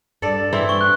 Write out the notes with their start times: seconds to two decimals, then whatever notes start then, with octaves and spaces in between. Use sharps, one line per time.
0.22 G2 A4 D5
0.53 E3 C4 E4
0.69 C#6 G7
0.81 F#6